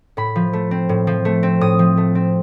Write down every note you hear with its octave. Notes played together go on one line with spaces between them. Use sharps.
A2 B5
F3
A3
C4
A2
F3
A3
C4
A2 D#6
F3
A3
C4